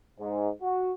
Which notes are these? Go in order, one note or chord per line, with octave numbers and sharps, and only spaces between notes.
G#2
F#4